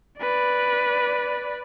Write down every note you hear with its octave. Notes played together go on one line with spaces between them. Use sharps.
B4 D5